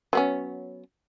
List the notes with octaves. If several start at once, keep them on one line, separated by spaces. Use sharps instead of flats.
F#3 B3 C#4